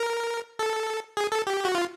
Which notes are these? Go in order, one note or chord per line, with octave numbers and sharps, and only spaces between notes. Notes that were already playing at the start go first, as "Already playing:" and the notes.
Already playing: A#4
A4
G#4
A4
G4
F#4
F4